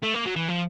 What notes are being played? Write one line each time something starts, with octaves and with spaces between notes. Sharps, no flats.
A3
A#3
F#3
E3
F3